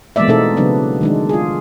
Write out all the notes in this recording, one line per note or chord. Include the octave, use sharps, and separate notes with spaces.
E3 G#3 A#3 B3 D5 E5
B2 A3 C4 D#4 A4 E5
C#3 F#3 B3 D4
D#3 G#3 D4
F4 G#4